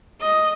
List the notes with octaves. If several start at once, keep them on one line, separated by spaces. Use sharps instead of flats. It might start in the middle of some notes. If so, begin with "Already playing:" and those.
D#5